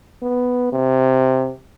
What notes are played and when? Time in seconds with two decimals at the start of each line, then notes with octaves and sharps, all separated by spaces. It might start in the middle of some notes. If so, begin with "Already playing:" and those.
0.22 B3
0.72 C3